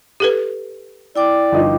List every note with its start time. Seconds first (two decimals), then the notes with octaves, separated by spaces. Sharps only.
0.20 G4 A4 B4
1.16 E4 D5 G5 D6
1.52 G1 F3 D#4